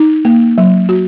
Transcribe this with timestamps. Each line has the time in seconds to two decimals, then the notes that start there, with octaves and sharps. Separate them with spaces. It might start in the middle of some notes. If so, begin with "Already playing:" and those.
Already playing: D#4
0.25 A#3
0.58 F#3
0.89 F#4